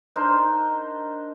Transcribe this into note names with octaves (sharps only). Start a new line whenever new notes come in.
D4 D#4 A#4 C5